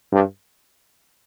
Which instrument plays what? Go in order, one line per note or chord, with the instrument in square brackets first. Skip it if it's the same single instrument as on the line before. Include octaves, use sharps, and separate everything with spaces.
[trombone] G2